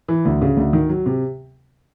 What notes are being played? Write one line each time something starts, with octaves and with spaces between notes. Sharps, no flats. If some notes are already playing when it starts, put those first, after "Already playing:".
E3
D2
C#3
D2
D#3
F#3
C3